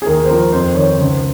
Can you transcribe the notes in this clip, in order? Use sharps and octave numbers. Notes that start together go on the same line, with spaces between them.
G#4
D#2 A#4
C5
F3 A#4
F2 C5
D#3 C#5
C#2 C5